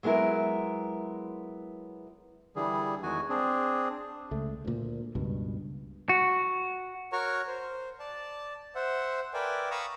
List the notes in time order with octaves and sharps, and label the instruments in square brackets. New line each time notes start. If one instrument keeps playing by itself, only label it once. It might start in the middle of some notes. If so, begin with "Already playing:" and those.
[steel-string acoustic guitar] F#3 G#3 B3 E4 A#4
[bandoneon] D3 E3 G3 G#4
E2 D#3 G#3 F#4 G#5
C4 D4 G#4
[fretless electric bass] C#2 A3
D2 A#2
C#2 G2 B2
[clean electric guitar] F#4
[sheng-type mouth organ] F#4 A#4 C#5 A#5 C#6 F6
C5
D5 A5
C5 E5 F#5
A#4 B4 D5 E5 G5 G#5
F5 A#5 B5 C#6 D#6 E6